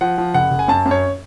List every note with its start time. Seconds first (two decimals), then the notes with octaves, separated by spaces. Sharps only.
0.01 F3 F#5
0.18 F3
0.34 F#1 F#5
0.51 F#1
0.59 G#5
0.68 F#2 A5
0.86 F#2
0.91 C#5